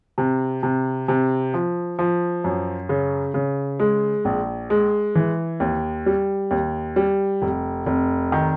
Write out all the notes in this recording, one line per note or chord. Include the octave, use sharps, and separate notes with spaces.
C3
C3
C3
F3
F3
F#2
C#3
C#3
G#3
A#1
G#3
E3
D#2
G3
D#2
G3
F1
F1
D#3